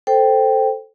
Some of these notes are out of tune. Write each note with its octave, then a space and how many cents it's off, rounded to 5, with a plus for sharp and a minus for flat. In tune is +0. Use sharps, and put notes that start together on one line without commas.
A4 +0 C5 +0 G5 +0